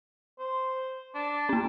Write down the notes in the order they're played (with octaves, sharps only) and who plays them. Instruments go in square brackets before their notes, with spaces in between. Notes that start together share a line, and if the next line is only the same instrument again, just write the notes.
[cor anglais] C5
D4
[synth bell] A#3 C#4